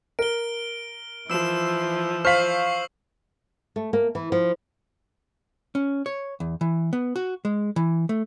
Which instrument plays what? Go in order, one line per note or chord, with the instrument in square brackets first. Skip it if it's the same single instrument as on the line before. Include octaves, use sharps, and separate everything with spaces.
[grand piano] A#4 [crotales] D7 G7
[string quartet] E3 F3 [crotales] E6 E7
[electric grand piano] C5 F5 [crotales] C#6 C7 F#7 [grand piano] F6 B6
[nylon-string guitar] A3
A#3
E3
F3
[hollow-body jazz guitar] C#4
C#5
E2
E3
B3
F#4
G#3
E3
A3